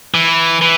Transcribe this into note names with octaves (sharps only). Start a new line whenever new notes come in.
E3
E3